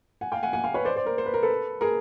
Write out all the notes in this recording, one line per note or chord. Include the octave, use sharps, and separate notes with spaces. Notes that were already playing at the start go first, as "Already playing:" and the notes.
F#5 G#5
F5 G5
F#5 G#5
F#5 G#5
F5 G5
B4 C#5
C5 D5
C5 D5
A#4 C5
C5
B4
A#4
A4 B4
G#4 A#4